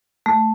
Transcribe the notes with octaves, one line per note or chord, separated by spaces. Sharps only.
A3